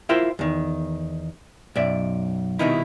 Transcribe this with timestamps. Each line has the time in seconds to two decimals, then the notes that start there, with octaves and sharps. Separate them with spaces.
0.09 E4 F4 A#4 C5 E5 G5
0.39 E2 D#3
1.76 B1 F#2 D5 E5
2.59 C2 F2 B2 D#3 D#4 E4